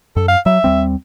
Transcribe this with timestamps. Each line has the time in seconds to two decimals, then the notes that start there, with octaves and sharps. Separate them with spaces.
0.16 F#2 A4
0.28 F5
0.46 F#3 E5
0.64 D#2 G3 C4